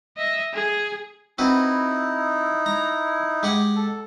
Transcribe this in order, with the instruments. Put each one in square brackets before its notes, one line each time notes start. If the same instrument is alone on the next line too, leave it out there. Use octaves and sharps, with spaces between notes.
[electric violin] D#5 E5
G#4
[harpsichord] C4 F#4 B4 [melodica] D#4 E4
[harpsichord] A#5
G#3 G4 F#5
[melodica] A4